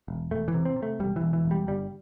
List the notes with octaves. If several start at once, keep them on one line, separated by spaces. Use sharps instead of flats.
E1
E1 A3
E3
C3
C4
C3
A3
E1 G3
E3
E1
E3
E1
G3
G1 G3